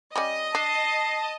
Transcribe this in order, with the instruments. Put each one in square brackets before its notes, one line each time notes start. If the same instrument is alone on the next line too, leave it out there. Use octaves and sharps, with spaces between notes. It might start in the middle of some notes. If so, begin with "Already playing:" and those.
[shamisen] G3 C#4 [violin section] D#5
[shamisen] D4 [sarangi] A5 [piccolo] C7